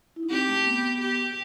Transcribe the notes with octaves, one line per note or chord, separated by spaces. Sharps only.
E4
D#4
C4 G4
A3
B3
G4